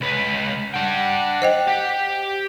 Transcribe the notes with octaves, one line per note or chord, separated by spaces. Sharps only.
C#2 B4
D4 F#5 G5
C5 D#5 G5
G4